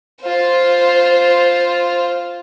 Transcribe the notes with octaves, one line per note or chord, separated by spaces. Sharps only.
F4 C5